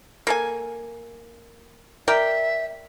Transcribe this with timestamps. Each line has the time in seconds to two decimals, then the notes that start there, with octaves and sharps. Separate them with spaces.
0.27 A#3 A4 G#5
2.08 A#4 D5 E5 G5